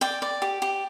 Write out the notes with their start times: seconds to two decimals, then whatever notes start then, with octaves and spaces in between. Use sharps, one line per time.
0.01 D5 G5
0.22 D5
0.42 G4
0.62 G4